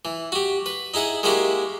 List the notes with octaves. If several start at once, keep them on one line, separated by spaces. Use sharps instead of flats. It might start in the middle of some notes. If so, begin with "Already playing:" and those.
E3
F#4 G4
B4
D#4 E4 G#4 F#5
G#3 A#3 E4 F#4 G4